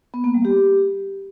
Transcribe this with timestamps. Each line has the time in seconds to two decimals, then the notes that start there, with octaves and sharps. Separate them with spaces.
0.14 B3
0.24 A#3
0.34 G3
0.45 G4